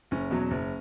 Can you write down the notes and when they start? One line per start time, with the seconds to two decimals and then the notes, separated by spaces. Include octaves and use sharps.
0.11 F#1 C#4
0.31 E2 B2 F#3
0.51 F#1